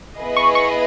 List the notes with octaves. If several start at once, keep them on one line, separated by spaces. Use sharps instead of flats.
B3 E4 G#4 B4 D#5
C#6
C#6